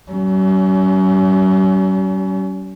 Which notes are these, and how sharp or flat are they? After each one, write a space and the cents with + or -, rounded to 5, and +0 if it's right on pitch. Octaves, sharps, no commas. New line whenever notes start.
F#3 +45 C#4 +25